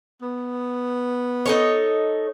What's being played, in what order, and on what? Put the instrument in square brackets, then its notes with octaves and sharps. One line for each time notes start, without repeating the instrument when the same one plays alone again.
[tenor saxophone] B3
[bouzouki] D#4 A4 C#5